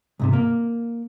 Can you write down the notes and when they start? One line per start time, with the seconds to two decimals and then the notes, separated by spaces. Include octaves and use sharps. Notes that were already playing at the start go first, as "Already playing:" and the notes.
0.20 C2 G#2 C3
0.33 A#3